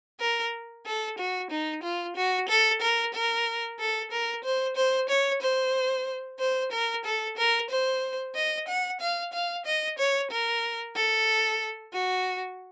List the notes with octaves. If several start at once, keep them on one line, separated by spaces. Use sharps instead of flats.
A#4
A4
F#4
D#4
F4
F#4
A4
A#4
A#4
A4
A#4
C5
C5
C#5
C5
C5
A#4
A4
A#4
C5
D#5
F#5
F5
F5
D#5
C#5
A#4
A4
F#4